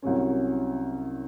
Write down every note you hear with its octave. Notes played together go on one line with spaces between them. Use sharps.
C2 C3 F#3 C#4